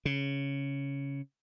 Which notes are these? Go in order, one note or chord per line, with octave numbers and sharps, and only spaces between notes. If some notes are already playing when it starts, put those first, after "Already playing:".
C#3